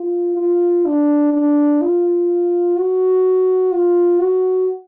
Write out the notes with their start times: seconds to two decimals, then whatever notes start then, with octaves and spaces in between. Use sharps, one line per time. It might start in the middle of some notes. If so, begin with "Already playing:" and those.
Already playing: F4
0.37 F4
0.85 D4
1.34 D4
1.81 F4
2.77 F#4
3.72 F4
4.20 F#4